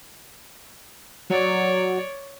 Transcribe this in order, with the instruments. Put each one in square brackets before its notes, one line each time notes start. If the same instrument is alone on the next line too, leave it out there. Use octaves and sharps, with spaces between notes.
[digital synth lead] F#3 [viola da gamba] C#5 D5